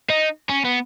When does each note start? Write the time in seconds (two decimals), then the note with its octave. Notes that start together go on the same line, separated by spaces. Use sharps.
0.10 D#4
0.49 C#4
0.65 B3